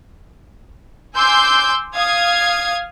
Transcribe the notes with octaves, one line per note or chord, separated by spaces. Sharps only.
G#5 C6 D6 E6 G6
F5 D#6 G#6